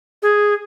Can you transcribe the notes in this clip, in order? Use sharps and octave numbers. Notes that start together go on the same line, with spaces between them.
G#4